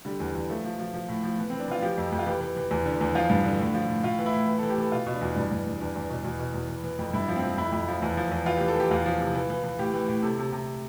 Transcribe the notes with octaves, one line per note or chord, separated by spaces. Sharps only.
D3 G3
E2
E2
F3 A3
F3
F3
F3
A2
F3
E3 B3
E3 C4
D4
E3 F4
F3 G4
F2
F2
F4
E3 G4
E3
E3
E2
D3
E2
F3 F4
G2
D3
A2
F3
A2
A2 F4
E3
E4
A2
E3
E3 A4
G4
E3 A4
B2 F4
B2
D4
E2
G2 D4
G2
G2
E2 D4
E2
B2
E2
B2
E2
E3
E3
F2
G2 E4
F3
C4
F3
F2 E4
F2
F3
E2
F3
E2
E3 F4
E3 G4
A4
E3 G4
E2 F4
F3
C3
E3
E3
E3
A2 G4
E3
A2
C3 A4
C3
C3